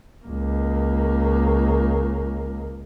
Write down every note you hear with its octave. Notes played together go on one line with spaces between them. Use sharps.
C#2 A#3